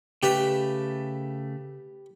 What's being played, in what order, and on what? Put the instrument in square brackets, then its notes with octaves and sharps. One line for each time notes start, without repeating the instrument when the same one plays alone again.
[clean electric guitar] C#3 A3 [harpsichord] G4 B4